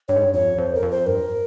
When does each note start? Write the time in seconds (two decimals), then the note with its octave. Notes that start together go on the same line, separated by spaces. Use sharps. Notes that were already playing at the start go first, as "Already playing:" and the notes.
0.08 G2 C#5
0.16 G#2
0.24 G2
0.33 F2 C#5
0.58 F2 C5
0.75 A#4
0.83 F2
0.91 C5
1.07 G2 A#4